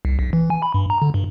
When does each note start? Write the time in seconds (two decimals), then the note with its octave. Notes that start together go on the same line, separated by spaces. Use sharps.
0.05 C2
0.19 B1
0.33 E3
0.50 G#5
0.62 B5
0.74 G2
0.90 A#5
1.02 D3
1.14 G2